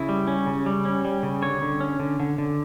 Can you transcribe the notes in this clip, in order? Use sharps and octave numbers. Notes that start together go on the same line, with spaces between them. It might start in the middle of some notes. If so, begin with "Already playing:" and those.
Already playing: C#3 E4
G3
C#4
C#3
G3
C#4
G3
C#3
D3 C#5
D3
C#4
D3
D3
D3